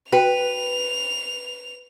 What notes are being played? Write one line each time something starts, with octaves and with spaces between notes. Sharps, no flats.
F#4 B4 G5 F7